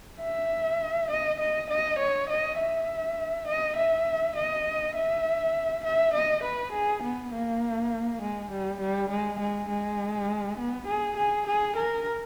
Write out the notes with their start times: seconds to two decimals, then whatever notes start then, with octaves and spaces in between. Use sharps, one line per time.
0.21 E5
1.10 D#5
1.40 D#5
1.70 D#5
1.99 C#5
2.29 D#5
2.59 E5
3.48 D#5
3.76 E5
4.37 D#5
4.95 E5
5.84 E5
6.14 D#5
6.43 B4
6.72 G#4
7.03 B3
7.32 A#3
8.22 G#3
8.51 G3
8.81 G3
9.10 G#3
9.40 G#3
9.69 G#3
10.58 B3
10.87 G#4
11.17 G#4
11.47 G#4
11.76 A#4